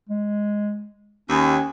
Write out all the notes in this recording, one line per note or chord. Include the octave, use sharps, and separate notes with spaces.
G#3
D#2 C#4